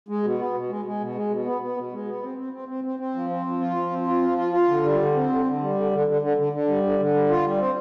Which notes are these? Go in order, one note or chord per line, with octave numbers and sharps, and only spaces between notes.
G#3
B2
B3
B2
G#3
G#3
B2
G#3
B2
B3
B3
B2
G#3
B3
C4
C4
C4
C4
C4
C4
F3
C4
F3
F4
F3
C4
F4
F3
F4
F4
D3
G3
D3
C4
D3
D3
G3
D3
D3
D3
D3
D3
D3
G3
D3
D3
G3
F4
G3
C4